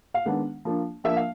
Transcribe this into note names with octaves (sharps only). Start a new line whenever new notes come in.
F5
D#3 G#3 B3 D4 F#5
F3 A#3 D4
F3 A#3 D4 E5
F5